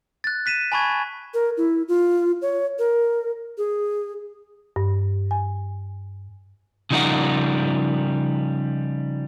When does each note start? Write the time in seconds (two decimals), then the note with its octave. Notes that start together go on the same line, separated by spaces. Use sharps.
0.24 F#6 A6
0.46 F#6 B6 D#7 E7
0.72 G#5 A5 B5 C#6 G#6
1.34 A#4
1.57 E4
1.88 F4
2.42 C#5
2.79 A#4
3.58 G#4
4.76 G2
5.31 G#5
6.91 C#3 F3 G3 D#4 A#4 F#5